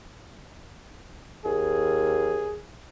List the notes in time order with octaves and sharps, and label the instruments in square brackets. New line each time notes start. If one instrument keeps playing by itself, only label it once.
[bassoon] D#2 [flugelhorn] G#4